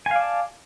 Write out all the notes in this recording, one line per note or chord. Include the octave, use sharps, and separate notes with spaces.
D5 F5 G#5 A5